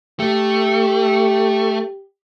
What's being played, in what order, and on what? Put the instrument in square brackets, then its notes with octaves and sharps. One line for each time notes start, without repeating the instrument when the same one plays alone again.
[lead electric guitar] A3 [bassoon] G4